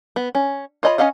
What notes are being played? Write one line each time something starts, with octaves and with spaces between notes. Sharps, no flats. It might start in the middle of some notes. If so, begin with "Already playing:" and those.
B3
C#4
F4 C#5 D#5 G5 B5
C#4 D#4 D#5 F5 F#5